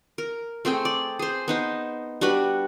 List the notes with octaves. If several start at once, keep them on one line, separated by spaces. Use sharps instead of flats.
A#4
A3 C4 G#4 G5
D5
G#4 C5
B3 D#4 C5
G3 D4 F#4 B4